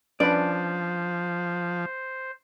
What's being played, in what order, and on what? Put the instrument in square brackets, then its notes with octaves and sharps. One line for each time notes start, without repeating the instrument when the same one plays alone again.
[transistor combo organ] F3 [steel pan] C#4 D4 B4 [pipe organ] C5 [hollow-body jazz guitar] D5